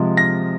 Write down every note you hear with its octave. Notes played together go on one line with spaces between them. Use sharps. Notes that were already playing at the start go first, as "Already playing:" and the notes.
Already playing: C3 F3 G#3
A#6